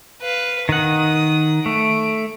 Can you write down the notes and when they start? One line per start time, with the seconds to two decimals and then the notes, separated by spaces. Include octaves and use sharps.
0.21 B4 F5
0.69 D#3 F#5 D#6
1.66 A3 D7